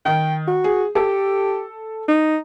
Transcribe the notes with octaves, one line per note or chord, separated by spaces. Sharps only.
D#3 G5
F#4
G#4
G4 A4
D#4